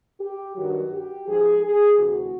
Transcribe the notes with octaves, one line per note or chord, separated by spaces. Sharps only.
G4
G2 D#3 F#3 F#4
G4
G#2 F3 G#4
G#4
D2 C3 E3 F#4